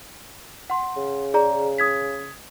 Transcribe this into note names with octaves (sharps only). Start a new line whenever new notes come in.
F#5 C6
C#3
G#4 D5 A#5
D#6 G#6 B6